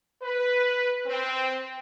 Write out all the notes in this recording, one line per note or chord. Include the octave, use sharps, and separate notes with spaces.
B4
C4